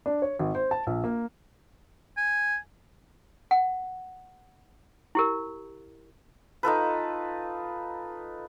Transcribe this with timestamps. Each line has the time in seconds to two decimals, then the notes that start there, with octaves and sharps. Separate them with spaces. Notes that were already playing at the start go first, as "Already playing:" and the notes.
0.06 D4
0.22 C#5
0.39 G#1
0.55 C5
0.71 A5
0.87 A#1
1.04 A#3
2.17 G#5
3.51 F#5
5.15 E4 G4 A#4
6.63 D#4 F4 A4 B4